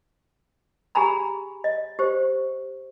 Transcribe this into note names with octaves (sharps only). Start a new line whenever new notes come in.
G4 G#4 G#5 A#5 B5
D#5
G4 C5